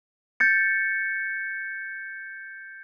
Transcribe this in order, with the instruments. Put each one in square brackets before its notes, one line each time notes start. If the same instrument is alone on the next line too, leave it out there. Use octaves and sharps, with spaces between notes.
[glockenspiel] G6 A6 C#7